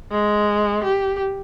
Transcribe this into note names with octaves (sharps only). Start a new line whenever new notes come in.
G#3
G4